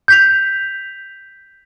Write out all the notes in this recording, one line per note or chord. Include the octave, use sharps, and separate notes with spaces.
G6 B6 F7